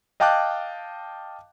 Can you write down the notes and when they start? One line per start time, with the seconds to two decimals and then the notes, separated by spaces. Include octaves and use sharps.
0.20 D#5 F5 G5 A5 D6 F#6